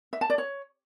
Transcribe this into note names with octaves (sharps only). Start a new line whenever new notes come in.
E5
A5
D5
C#5